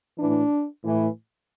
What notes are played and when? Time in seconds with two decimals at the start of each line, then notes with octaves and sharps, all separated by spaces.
0.19 A2 E3 D4
0.84 A2 E3